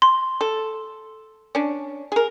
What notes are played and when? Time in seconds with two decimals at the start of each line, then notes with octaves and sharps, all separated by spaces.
0.02 C6
0.41 A4
1.55 C#4 D4
2.12 G#4 A#4